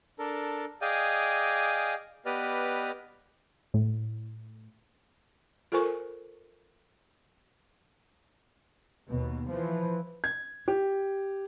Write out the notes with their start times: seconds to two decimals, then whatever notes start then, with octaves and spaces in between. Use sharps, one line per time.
0.19 D4 A4 A#4
0.82 G#4 D5 D#5 F5 G5 G#5
2.26 B3 G4 B4 D5 D#5 F6
3.74 A2
5.72 F4 A4 A#4 C5 G#5 C#6
9.08 D#2 B2
9.49 E3 F3
10.24 G#6
10.68 G4